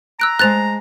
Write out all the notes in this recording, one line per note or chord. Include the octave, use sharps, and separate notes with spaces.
A#5 E6 F#6 D7
G#3 C5 A5 F#6 A6 F7